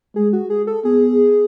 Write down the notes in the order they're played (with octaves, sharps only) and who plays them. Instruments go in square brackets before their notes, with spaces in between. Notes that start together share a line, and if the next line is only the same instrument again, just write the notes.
[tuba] G#3 [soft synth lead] G#4
[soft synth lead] F#4
G#4
A4
[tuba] B3 [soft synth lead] G#4